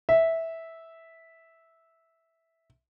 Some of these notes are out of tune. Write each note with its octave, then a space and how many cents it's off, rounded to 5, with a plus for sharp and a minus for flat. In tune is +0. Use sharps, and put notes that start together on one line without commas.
E5 -10